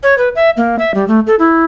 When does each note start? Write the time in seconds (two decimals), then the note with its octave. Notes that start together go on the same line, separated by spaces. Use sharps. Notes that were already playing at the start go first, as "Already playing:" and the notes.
0.03 C#5
0.18 B4
0.36 E5
0.57 A#3
0.79 E5
0.94 G3
1.08 A3
1.27 A4
1.39 E4